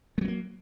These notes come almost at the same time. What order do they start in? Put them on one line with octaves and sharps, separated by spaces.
G#3 F#3 B3 A#3